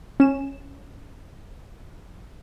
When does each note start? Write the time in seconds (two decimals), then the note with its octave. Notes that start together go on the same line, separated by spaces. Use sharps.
0.20 C#4 E7